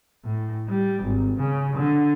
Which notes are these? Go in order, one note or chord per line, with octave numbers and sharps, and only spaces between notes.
A2
G3
G#1
C#3
D3